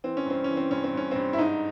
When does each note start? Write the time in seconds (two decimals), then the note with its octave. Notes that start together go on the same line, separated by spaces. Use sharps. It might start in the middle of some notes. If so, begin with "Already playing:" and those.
0.04 E3 C4
0.17 C#4
0.26 G2 C4
0.44 E3 C#4
0.57 C4
0.71 G2 C#4
0.84 C4
0.93 G2 C#4
1.11 G2 C4
1.33 E4
1.38 G#2 D#4